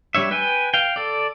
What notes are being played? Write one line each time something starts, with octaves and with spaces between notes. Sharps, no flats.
G3 D4 C#5 E5
B4 G5 G#5
F5 G5
A4 D5